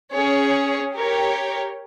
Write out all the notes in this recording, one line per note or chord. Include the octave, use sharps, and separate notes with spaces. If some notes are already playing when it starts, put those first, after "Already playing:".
C#4 G#4 C#5
G4 A#4 C#5 G5